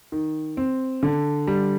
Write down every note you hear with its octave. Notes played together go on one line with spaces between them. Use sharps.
D#3
C4
D3
G3